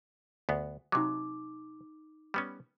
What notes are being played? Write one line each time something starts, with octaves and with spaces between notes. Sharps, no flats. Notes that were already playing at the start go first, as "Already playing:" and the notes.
D2 B3
C3 F#3 D#4 D6
G3 B3 C#4